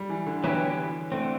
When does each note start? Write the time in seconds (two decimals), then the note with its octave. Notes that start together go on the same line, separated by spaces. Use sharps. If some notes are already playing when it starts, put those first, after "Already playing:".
Already playing: G3
0.09 E3
0.26 D3
0.44 E3 F#3 B3 E4 G4
1.12 D3 A3 C4